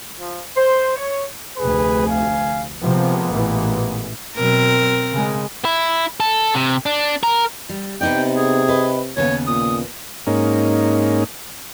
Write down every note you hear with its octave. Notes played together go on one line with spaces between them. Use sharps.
F3
C5
C#5
F1 D2 G#4 B4
F5 G#5
C3 F3 G#3 A#3 B3
A1 A#2 E3
B2 F#3 C4 A#4
C#3 G#3
E4
A4
C3
D4
A#4
G3
C3 B3 D#4 D5 G5
G#4
B4 D#5
D#2 C#3 B3 C#5
A#2 D#6
G#2 A#3 C#4 D#4